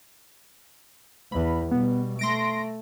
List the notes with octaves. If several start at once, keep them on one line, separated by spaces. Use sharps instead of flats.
E2 B5
B2 G3 B3
A3 C6 A#6 D7